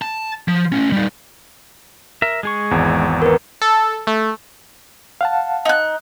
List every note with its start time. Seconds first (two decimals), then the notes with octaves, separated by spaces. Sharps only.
0.02 A5
0.48 F3
0.72 A3 C#4
0.92 G3 D#4
2.22 A#4 E5
2.43 G#3 G#4 C#6
2.71 G#1 E2
3.22 A#4 B4
3.62 A4
4.07 A3
5.21 F5 F#5 A5
5.65 D#4 F#6